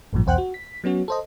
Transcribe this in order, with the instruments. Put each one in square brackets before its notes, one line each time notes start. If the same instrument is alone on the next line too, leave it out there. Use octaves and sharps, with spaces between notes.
[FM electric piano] A1 G2 A#2 F3
B1 E2 C5 F#5 G5 F#6
F#4
B6
F#3 B3 C#4 F#4
A4 C5 D#5